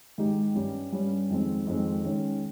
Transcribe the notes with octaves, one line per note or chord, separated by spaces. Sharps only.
G#2 D#3 G#3 D#4 G4
G2 G3 C#4 G4
G2 G3 C#4 G4
F2 D#3 G#3 C4
F2 D#3 G#3 C4
D#3 G#3 C#4